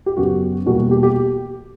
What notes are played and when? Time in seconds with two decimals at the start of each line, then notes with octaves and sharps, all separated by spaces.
0.06 G4
0.17 F#2 C#3 F#3 B3 F#4
0.66 E2 B2 G3 A#3 F#4
0.78 F#4
0.91 G4
1.03 G4